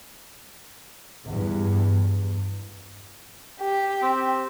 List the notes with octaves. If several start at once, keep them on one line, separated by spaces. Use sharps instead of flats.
E2 G2
G4
C4